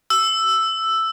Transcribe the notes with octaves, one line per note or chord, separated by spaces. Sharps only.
E6